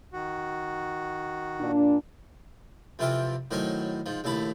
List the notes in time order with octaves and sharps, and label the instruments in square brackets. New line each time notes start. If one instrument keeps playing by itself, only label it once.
[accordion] D#3 F#4
[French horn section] A#2 D4
[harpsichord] F2 C3 E3 F4 E5 G5
A2 D#3 F#3 C5 G#5
G#2 F3
A#1 D#2 A2 A5 B5